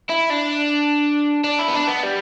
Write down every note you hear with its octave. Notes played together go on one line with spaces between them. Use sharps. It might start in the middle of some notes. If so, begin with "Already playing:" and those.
E4
D4
D4
E4
B3
D4
B3
G3